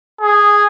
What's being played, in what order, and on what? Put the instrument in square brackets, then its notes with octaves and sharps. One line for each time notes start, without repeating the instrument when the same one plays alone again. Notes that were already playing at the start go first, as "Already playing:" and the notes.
[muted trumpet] G#4